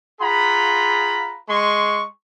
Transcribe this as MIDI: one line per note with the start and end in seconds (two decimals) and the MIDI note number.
0.21 1.36 65
0.21 1.36 68
0.21 1.36 78
0.21 1.36 82
0.21 1.36 83
1.49 2.04 56
1.49 2.04 84
1.49 2.04 85